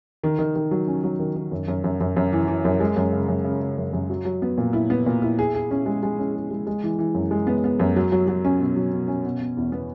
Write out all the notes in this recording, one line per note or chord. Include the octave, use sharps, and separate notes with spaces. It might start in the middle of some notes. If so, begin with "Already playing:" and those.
D#3
D#3
D#3
F#3
C#4
F#3
D#3
D#3
F#2
F#2
F#2
F#2
F#2
E3
E3
F#2
G#3
F#2
C#3
F#2
C#3
C#3
F#2
F#2
F#3
F#3
B3
A#2
E4
B3
A#2
E4
G#4
G#4
C#4
G#3
G#3
C#4
G#4
G#3
G#3
E3
E3
F#2
G#3
B3
B3
F#2
F#3
F#3
F#3
C#4
B2
F#3
B2
C#4
B2
B2
E2
B3